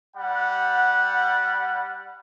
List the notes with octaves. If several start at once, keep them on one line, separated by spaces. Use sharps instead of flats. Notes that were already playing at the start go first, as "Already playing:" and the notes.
G3 F#5